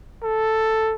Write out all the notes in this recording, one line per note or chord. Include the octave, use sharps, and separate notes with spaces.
A4